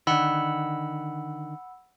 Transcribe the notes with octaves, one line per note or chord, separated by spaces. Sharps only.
D3 D#3 F#5 B5 E6